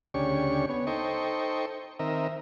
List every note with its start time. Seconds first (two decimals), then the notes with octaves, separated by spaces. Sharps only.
0.14 D2 C#3 C#4 D4 G4 C#6
0.69 B3 C#5
0.87 D#4 A4 C5 D#5 G5 C#6
1.99 D#3 C4 A#4 D#5 E5